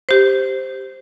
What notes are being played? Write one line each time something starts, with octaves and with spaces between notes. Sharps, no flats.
G4 C5